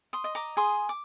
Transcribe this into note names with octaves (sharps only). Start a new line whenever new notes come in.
C6 D#6
D#5
A#5 D6
G#4 C6 D#6
D6